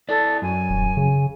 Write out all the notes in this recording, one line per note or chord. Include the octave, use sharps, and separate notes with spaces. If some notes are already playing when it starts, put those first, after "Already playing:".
E4 A4 D5
F#2 G#5
D#1
C#3